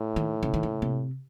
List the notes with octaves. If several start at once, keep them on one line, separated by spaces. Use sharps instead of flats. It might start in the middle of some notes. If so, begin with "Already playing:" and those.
Already playing: A2
D#3
C#3
D#3
C#3
C3